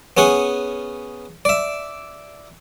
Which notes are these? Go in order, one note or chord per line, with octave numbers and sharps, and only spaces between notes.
B3 C#4 G#4 F#5
D5 E5